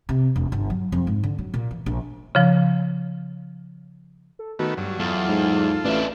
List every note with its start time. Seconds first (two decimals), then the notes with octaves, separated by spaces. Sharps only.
0.09 C3
0.36 E1
0.52 G1
0.70 F#3
0.92 F2
1.07 G#2
1.24 D3
1.39 F#3
1.54 A#2
1.71 E3
1.86 A#1
2.35 C#3 F3
4.39 A4
4.59 D#3 A3 B3 F#4
4.77 G2 F#3
4.99 E2 F#3 F4 A4
5.28 G#2
5.85 A1 D4 E4 B4